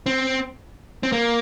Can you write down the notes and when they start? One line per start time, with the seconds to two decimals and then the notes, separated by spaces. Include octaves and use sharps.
0.06 C4
1.03 C4
1.12 A#3